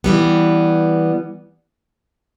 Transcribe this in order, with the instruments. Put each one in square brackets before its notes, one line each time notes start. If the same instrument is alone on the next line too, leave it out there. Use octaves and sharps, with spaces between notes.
[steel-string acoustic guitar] E3 G3 B3